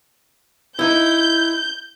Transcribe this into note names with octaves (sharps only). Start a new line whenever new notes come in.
D#4 E4 G6